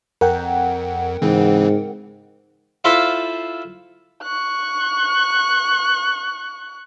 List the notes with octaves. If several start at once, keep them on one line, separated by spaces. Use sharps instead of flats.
F2 A#4 F#5 G5
G#2 C#3 E3 C4
E4 F4 A4 C5 E5 F5
C#6 F#6